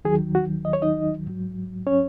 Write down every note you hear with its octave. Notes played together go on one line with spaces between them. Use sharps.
D#2 D#3 F#3 G#4
F#4
D#5
C#5
D#4 D#5
G#2 F#3
C#4 C#5